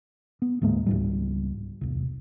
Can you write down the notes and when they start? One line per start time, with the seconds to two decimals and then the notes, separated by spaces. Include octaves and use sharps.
0.42 B3
0.62 D2 G#2 G#3 A#3
0.86 C#2 G#2 G3
1.81 E1 C2